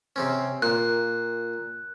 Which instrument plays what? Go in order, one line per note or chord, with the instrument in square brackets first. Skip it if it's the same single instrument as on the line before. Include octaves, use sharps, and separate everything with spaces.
[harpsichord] C3 C4 C#4
[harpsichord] A#2 [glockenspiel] F#6